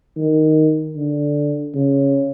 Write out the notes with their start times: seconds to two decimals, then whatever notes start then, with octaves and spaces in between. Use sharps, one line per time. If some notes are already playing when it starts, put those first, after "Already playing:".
0.17 D#3
0.97 D3
1.75 C#3